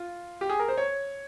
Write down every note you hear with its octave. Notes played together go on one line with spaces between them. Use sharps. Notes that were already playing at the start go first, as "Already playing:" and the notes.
Already playing: F4
G4
G#4
A#4
C5
C#5